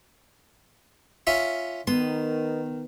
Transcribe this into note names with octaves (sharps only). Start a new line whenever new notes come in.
C#4 F4 E5
D#3 B3 C6